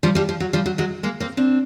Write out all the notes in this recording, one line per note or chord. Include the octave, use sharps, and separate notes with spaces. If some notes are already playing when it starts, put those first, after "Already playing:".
F3 G3
F3 G3
F3
F#3
F3 G3
F#3
F#3 G#3
G#3 A#3
A#3 C4
C4 D4